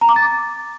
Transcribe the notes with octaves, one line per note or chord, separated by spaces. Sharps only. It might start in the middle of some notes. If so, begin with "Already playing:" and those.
A#5
D6
A6